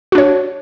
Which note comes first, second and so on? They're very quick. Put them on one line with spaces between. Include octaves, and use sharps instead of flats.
F#4 D4 C#5